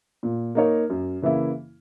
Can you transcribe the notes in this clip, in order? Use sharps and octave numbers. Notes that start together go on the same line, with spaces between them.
A#2
A#3 D#4 A#4 C#5
F#2
C#3 E3 A#3 E4